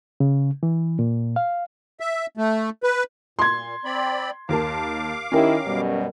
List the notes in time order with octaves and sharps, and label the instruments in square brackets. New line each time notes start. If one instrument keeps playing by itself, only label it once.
[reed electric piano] C#3
E3
A#2
F5
[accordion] E5
A3
B4
[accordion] A#2 [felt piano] C6 G#6
[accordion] C4 D5 B5
[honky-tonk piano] D#2 A#4 A5 [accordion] F5 D6
[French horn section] D#3 E4 [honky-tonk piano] C#4 G4 A#4
[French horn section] F#2 B2 G3